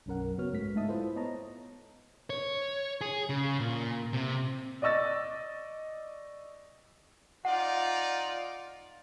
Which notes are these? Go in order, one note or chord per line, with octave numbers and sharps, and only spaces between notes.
B1 F#2 C#4 A#4 F#5
C#3 B3 F#4 C#5 F6
G#2 A3 F#4 B6
G#2 A3 D#4 E5 A5 D#6
E4 F4 A4 B4 C5
B3 C#5 D#5 A5 A#5
C#5
G#4
C#3
A#2
C3
D5 D#5 C#6 E6 A6
D#4 F4 D5 F#5